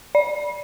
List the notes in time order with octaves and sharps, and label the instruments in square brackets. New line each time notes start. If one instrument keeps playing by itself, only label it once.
[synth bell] D5